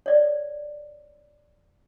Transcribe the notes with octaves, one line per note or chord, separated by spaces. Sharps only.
C#5 D5